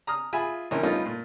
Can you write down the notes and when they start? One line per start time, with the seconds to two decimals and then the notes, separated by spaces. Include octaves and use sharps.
0.07 A#5 D#6 F6
0.33 F4 G#4 E5 G#5 B5
0.71 A#1 E3 C#4 A#4
0.83 G3 A3 B3 C#4 D#4 F4
1.05 A#2